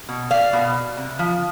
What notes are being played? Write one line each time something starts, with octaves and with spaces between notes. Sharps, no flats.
B2
D5 F5
B2
C3
F3